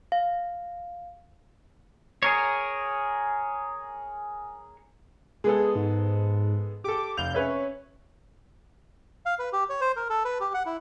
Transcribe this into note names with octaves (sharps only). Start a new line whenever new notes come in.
F5
G#4 A#4 C#5
G#3 B3 G#4 A4
G#2
G4 A4 D6
F1 F5 G6 F7
C#4 B4 C#5 E5
F5
B4
G4
C#5
C5
A#4
A4
B4
G4
F#5
E4